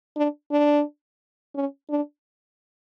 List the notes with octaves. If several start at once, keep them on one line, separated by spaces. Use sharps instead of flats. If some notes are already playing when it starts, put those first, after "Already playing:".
D4
D4
C#4
D4